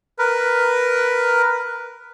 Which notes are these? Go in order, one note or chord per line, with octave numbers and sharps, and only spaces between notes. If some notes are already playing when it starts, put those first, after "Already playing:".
A#4 B4